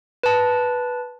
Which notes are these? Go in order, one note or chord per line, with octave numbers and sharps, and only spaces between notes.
B4 A5